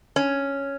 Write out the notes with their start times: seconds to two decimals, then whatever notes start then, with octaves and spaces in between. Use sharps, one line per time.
0.16 C#4